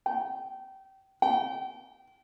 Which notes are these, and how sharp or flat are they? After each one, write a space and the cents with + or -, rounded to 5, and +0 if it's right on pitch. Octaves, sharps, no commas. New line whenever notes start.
G5 -25
G5 -30